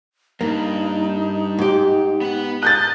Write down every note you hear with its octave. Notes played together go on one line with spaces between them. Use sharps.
G2 A#3 D#4
G#2 G4
B3 F#5
D#5 F#6 G6 A6